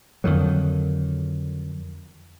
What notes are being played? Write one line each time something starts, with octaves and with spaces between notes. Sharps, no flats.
F2 D3 D#3 F#3